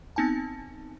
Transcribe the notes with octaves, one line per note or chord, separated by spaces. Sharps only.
B3 C4 D#4 G#5 A5